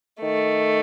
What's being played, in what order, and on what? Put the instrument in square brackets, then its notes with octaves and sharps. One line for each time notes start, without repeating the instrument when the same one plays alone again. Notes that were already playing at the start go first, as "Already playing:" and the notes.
[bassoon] D#3 [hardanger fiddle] A3